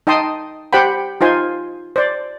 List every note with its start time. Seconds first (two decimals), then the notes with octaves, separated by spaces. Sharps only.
0.07 D#4 D#5 G5 A5 C6 D#6
0.73 G4 C5 F#5 G5 B5
1.21 D#4 F4 C5 G#5
1.96 C5 D5